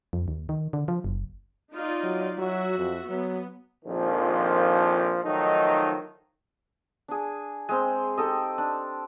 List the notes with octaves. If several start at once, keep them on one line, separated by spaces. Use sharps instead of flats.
F2
D#2
D#3
D3
F3
F#1
D#4 F4 D5
F#3
F#3 F#4 E5
F2
F#3 B3
A#1 F2 D#3 F3
D#3 F3 F#3 A3 D#4
D4 G#4
G#3 C4 C6
D#4 G4 A4 D#5
D4